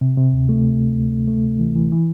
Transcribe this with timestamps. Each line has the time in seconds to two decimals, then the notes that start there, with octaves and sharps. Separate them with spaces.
0.01 C3
0.17 C3
0.33 D2
0.49 A3
0.64 C3
0.80 C3
0.96 D2
1.12 A3
1.28 A3
1.44 C3
1.59 E3
1.76 E3
1.92 E3